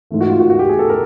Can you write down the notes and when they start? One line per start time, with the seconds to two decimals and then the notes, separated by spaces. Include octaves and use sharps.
0.11 G#2 E3 A3
0.21 F#4
0.30 F4
0.40 F#4
0.50 F#4
0.59 G4
0.69 G#4
0.79 A4
0.89 A#4